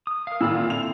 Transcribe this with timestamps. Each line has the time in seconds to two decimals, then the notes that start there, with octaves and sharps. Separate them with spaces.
0.07 D#6
0.27 A#4 F5
0.41 A#2 D#3 F4 D5 B5 E6
0.53 D3 C4 E4
0.70 F7